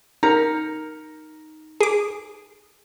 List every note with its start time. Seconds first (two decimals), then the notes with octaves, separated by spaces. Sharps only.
0.23 D#4 A#4 A#5
1.81 G#4 D6